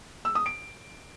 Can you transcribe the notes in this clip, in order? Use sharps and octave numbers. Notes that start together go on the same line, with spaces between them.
E6
D#6
D7